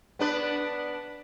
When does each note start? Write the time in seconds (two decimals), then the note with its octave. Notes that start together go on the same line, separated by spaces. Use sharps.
0.19 B3 D4 B4